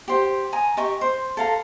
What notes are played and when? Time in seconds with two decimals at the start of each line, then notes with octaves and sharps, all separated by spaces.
0.08 G4 C5
0.53 G#5 A#5 D#6
0.77 G4 D#5 C#6 D6
1.01 C5
1.37 A4 F5 A#5